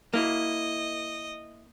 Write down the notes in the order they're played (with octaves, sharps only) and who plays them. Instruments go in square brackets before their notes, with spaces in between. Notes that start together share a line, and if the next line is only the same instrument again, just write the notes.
[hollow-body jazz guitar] A#3 E4 [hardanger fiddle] D#5